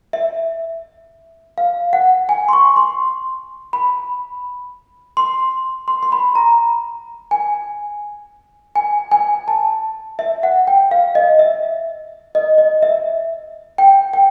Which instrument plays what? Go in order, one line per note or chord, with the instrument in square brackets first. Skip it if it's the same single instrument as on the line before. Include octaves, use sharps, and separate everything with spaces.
[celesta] E5
F5
F#5
G#5
C6
C#6
C6
B5
C6
C6
C6
B5
A#5
G#5
G#5
G#5
A5
E5
F#5
G5
F5
D#5
E5
D#5
D#5
E5
G5
G5